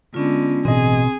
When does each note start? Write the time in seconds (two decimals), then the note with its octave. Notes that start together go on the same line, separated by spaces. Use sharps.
0.14 D3 G#3 B3 C#4 F4
0.65 A1 B2 C4 G#4 D#5